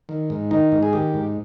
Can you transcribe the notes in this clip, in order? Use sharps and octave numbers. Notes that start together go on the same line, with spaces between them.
D#3
G#2
D#3 D#4
G#2
G#4
D#3 G4
G#2